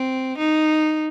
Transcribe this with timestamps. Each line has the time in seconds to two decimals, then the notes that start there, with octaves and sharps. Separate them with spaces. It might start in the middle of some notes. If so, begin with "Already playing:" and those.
Already playing: C4
0.38 D#4